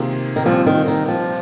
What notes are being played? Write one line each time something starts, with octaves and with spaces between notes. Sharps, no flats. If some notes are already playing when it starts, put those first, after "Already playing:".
Already playing: C3 D#3 A#3 F4 G#4
D#3
A#2 F3 G3 C4
D#3
D#3
F3